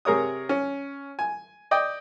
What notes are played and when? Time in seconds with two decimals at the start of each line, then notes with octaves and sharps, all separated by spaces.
0.05 C3 G#4 A#4 C#5 D#6
0.49 C#4
1.19 G#5
1.71 D5 D#5 G5